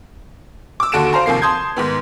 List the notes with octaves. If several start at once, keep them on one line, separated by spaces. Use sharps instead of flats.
D6 E6
D#2 D3 F#4 A4 D7 E7
C5 F5 A#5 C6
D#2 C3 F3 A#3 C7
A5 C6 D#6 G6 G#6
G#2 D#3 B3